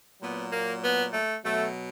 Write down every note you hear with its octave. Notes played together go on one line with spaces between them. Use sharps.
A#2 F#3 B3
A#3
B3
A3
B2 F#3 A3